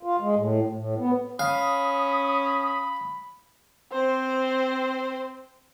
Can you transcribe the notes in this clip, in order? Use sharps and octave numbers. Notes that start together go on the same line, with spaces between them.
F4
G#3
A2
A2
B3
C#4 F5 B5 D#6
C4 C5